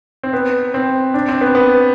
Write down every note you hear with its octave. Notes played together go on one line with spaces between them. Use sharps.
C4
B3
C4
D4
C4
B3
B3